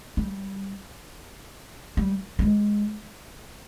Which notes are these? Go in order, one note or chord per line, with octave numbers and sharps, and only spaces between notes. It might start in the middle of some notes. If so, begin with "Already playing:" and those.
G3
G3
G3
G#3